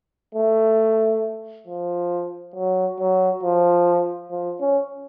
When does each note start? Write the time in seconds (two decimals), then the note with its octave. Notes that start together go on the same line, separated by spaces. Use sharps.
0.35 A3
1.67 F3
2.55 F#3
2.99 F#3
3.43 F3
4.31 F3
4.61 C#4